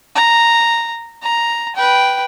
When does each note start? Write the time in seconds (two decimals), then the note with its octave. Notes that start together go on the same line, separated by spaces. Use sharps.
0.16 A#5
1.23 A#5
1.76 B4 G5